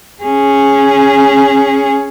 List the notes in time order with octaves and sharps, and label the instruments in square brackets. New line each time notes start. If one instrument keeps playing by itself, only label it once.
[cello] C#4 G#4